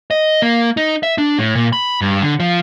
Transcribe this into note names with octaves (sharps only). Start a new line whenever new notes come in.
D#5
A#3
D#4
E5
D4
A2
A#2
B5
G2
D3
F3